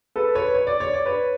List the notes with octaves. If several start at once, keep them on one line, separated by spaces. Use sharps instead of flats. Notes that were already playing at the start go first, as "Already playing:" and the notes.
A4 B4
B4 C#5
C#5
D5
C#5
D5
B4 C#5